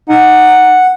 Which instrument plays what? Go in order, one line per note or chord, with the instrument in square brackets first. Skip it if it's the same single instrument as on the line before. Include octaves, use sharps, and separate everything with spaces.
[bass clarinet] D#4 [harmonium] F#5